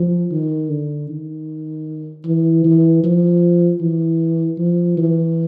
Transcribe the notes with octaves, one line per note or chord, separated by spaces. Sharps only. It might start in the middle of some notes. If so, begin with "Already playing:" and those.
Already playing: F3
D#3
D3
D#3
E3
E3
F3
E3
F3
E3